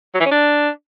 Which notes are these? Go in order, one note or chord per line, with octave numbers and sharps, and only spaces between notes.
F#3
E3
C#4
D4